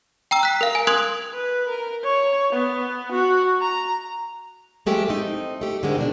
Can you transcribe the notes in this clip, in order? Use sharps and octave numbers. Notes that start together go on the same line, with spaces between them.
G5 A#5 E6
F#6 B6
A#4 F5
G#5
A#4 C6 D#6 F#6 G#6 F#7
B4
A#4
C#5
B3
F#4
A#5
F3 G#3 A3 G4 A#4 C5
A3 C4 D#4
A3 G4
D3 D#3 G#3 A#3 C4
B2 D4